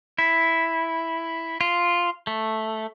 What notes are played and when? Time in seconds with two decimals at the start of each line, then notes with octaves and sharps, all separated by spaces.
0.18 E4
1.61 F4
2.27 A3